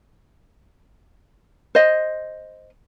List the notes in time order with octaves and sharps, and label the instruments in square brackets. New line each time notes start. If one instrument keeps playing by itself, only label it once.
[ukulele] C5 D#5